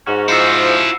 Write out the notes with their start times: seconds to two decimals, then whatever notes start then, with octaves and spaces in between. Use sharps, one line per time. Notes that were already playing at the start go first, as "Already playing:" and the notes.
0.07 G#2 C#4 F#4
0.28 F3 E4 F#4 E6 C7 C#7